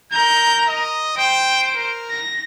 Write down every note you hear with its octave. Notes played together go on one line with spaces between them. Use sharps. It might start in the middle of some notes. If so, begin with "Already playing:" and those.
A#4 A#5 G6
D#5
C5 G5 D7
A#4
A#6